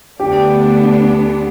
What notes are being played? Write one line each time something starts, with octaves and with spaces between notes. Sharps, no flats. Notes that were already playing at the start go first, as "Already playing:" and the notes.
D2 D3 B3 D4 G4